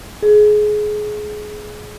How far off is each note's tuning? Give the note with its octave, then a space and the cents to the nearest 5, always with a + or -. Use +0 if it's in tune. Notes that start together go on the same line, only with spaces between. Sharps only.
G#4 +20